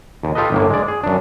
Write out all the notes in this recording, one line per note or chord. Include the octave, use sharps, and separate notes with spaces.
D#2
F4 G4 A4 B4 D#5
G1 A2 A#3
G#3 D5
G#4
F#2 D4